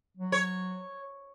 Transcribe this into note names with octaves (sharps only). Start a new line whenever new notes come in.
F#3
C#5